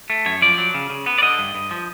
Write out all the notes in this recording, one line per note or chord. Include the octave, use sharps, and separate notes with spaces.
A3
F#2 C#5
F3 D5
F#3
C#3
C#3
B3
D5
D3 D#5
G2
G2
F3